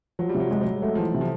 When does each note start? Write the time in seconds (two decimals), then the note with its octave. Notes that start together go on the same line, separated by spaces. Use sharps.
0.19 F3 F#3
0.29 G3
0.34 C3
0.40 F#3
0.51 G3 G#3
0.61 F#3
0.67 G#3
0.82 F#3 A3
0.95 E3 F3
1.14 C3
1.21 F3